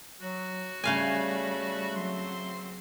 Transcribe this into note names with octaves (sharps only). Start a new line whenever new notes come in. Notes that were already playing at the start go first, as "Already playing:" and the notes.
F#3 F#4
C#3 G3 A3 F5 G#5
F#3 C4 C6